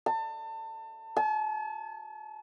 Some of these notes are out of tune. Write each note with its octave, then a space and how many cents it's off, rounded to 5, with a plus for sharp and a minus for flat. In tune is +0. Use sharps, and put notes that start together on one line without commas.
A5 +30
A5 -45